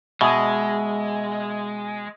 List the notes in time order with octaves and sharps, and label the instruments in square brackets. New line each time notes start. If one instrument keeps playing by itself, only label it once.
[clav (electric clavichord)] B2 [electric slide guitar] G#3 [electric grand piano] E5 G#5 D#6